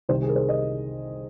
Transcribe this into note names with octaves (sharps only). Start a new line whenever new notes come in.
C2 C3 D#3 C5
G#4
A#4
C5
D#5